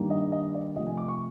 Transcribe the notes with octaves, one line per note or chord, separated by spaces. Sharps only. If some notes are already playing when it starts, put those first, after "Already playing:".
Already playing: G2 D#3 G3 A#3
D#5
D#5
D5
C3 F3 A3 D#5
G#5
D6
C#6